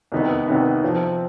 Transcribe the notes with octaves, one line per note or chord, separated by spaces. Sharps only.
C2 C3 D#3 B3 D#4
C2 C3 D#3 B3 D#4
C3 F3 C4